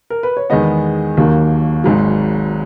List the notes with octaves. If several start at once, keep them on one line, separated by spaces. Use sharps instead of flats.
A#4
B4
C#5
E2 D#3 G#3 B3 D#5
D#2 D#3 F#3 A#3
G#1 G#2 F#3